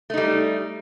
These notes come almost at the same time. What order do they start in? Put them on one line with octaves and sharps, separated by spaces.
A3 D#4 G3